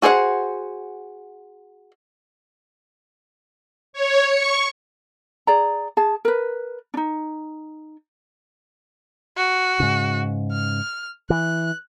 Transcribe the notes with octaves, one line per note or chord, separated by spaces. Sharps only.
F#4 G#4 C5 C#5 F#5
C#5
C#6
G#4 D5 A#5
G#4 A5
A#4 B4
D4 D#4
F#4
G#2 C#3
F6
E3 F#6